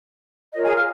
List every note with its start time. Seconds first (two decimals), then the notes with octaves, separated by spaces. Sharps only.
0.53 F4 A#4 C#5 D#5
0.64 G#4 G#5
0.76 F5 F6